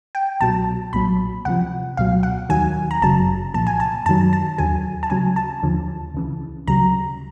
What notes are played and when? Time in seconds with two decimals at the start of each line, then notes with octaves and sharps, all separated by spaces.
0.15 G5
0.40 C2 B2 F#3 A5
0.93 B1 A#2 F#3 B5
1.45 D2 C3 F3 F#5
1.97 C#2 B2 F#3 F5
2.23 F#5
2.49 D#2 D#3 F#3 G#5
2.91 A#5
3.01 G1 F#2 C#3 F#3 A5
3.54 C2 A#2 F3 A5
3.67 G#5
3.80 A5
4.06 F#2 D#3 F#3 A5
4.33 A5
4.58 D#2 D3 F#3 G#5
5.03 A5
5.10 D2 C#3 F#3 G#5
5.36 A5
5.63 D#2 D3 F3
6.14 C#2 C#3 E3
6.67 D2 C#3 F#3 A#5